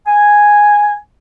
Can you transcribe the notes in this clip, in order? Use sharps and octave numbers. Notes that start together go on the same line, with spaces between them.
G#5